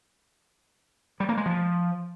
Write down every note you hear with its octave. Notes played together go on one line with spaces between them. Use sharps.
G3
A#3
G#3
F3